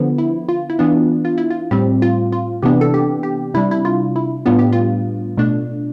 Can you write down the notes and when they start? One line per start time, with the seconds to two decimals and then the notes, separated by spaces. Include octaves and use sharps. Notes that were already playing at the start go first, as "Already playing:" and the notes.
Already playing: D3 F3 B3
0.18 E4
0.49 F4
0.70 E4
0.79 E3 B3 D4 F4
1.25 F4
1.38 E4
1.50 F4
1.71 A2 G3 C4 G4
2.02 F4
2.32 F4
2.62 C3 E3 B3 D4 G4
2.81 A4
2.94 G4
3.23 G4
3.54 C3 G3 D4 E4
3.71 E4
3.85 F4
4.16 E4
4.46 A2 G3 B3 D4 F4
4.59 G4
4.72 F4
5.37 B2 A3 D4